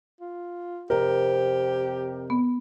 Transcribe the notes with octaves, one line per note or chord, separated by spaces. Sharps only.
F4
F2 C3 G4 A#4
B3